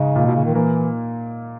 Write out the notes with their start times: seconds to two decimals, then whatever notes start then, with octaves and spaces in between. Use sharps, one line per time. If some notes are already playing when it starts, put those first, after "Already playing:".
Already playing: G#2 C#3 D#4
0.16 A#2
0.27 B2
0.36 C#3
0.46 D#3
0.55 E3 A#3